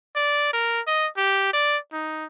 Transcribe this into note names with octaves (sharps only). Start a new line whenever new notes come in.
D5
A#4
D#5
G4
D5
D#4